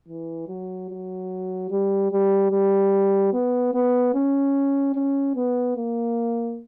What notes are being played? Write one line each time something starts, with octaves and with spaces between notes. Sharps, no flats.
E3
F#3
F#3
G3
G3
G3
B3
B3
C#4
C#4
B3
A#3